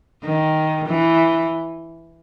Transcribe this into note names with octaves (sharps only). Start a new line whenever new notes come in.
D#3
E3